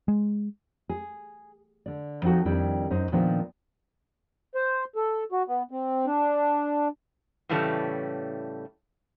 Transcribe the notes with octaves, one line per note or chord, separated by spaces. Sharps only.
G#3
G#4
D3 D5
F3 C4 D#4 F#4 A4
F2 D#3 G3 D4 E4 G5
F#2 D#4 C5
A#2 D#3 F3 B3 D4 C5
C5
A4
F#4
B3
C4
D4
A2 C#3 E3 G3 A3 C#4